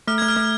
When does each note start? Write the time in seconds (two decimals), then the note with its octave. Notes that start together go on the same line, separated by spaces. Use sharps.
0.07 A3 F6
0.18 A3 G#6
0.28 F6
0.37 A3